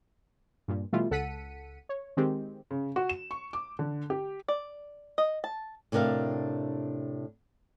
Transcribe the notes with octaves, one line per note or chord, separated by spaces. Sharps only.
G2 A#2
B2 E3 G3 A3 E4 F4
C#2 A4 F#5 B6 C#7 D#7
C#5
D#3 G#3 C4 G4
C#3
F#4
E7
C#6
D6
D3
G4
D5
D#5
A5
A2 C3 D4 A#4 F5